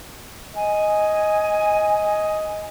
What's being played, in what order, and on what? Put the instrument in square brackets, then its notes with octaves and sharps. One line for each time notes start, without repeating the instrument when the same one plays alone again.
[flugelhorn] D#5 [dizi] G#5